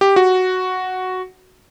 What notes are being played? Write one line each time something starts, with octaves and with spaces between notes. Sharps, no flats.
G4
F#4